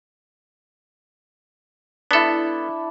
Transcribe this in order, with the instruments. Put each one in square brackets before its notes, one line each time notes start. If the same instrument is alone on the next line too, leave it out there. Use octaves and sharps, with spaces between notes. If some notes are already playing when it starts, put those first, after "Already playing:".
[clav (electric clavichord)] B3 A4 [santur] D4 E4